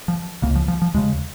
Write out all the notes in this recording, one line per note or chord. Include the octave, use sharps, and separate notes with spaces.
F3
C#2 C#3 A#3
F3
F3
F3
D#2 C#3 G#3